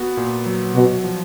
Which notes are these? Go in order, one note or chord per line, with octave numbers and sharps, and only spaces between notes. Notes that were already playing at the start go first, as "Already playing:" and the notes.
Already playing: B3 F#4
A#2
F#3
B2 F#4
F3